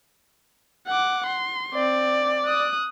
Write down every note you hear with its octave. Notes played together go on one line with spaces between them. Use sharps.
F#5 D6
C6
C4 D5
D#6 F#6